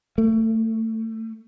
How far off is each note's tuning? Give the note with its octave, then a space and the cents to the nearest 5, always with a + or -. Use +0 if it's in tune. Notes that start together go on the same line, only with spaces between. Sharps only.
A3 +25